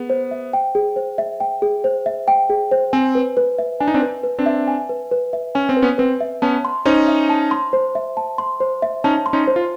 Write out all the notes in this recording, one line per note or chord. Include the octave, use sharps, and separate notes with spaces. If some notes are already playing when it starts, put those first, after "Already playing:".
Already playing: B3 G#4
C5
E5
G5
G#4
C5
E5
G5
G#4
C5
E5
G5
G#4
C5
C4 G#5
B4
B4
E5
D4 G#5
D#4
C4 D4
B4
B4
C4 D4
E5
G#5
B4
B4
E5
C#4 G#5
C4
B4
B3 C#4
C4 B4
E5
B3 C#4 A5
C6
C#4 D#4 C5
E5
A5
C6
C5
E5
A5
C6
C5
E5
C#4 D#4 A5
C6
C#4 D#4
C5
F4